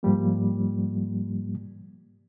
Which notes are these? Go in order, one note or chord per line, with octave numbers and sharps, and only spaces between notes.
G#2 F3 G3 A#3